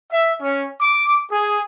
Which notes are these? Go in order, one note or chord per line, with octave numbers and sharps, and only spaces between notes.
E5
C#4
D6
G#4